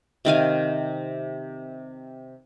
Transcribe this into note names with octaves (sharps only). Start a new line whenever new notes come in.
C3 D#3 F5 G#5